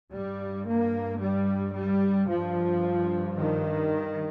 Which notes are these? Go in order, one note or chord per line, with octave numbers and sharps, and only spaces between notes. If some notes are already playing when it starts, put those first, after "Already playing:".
G2 G3
A#3
G3
G3
G2 F3
D#3